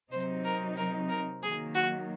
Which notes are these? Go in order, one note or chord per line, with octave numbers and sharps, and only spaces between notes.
C3 F#3 C4 D#4 C5
A#4
A#4
A#4
D#3 F#3 A#3 G#4
F#4